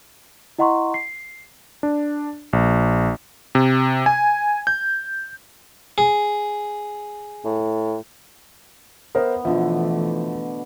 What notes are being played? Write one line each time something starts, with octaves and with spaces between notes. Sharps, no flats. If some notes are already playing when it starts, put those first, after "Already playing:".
E4 D#5 F#5 A#5 C6 C#6
C7
D4
A#1
C3
G#5
G6
G#4
A2
B3 A#4 C5 E5
B2 D3 E3 F3 A3 E5